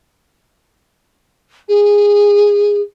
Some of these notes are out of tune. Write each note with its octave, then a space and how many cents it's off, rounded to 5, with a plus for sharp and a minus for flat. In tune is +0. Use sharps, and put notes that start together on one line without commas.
G#4 -15